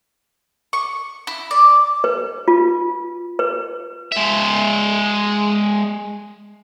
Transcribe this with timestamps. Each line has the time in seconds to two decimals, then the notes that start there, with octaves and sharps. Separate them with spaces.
0.73 C#6
1.27 E4
1.51 D5
2.04 B4
2.48 F4
3.39 B4
4.12 G#3 E5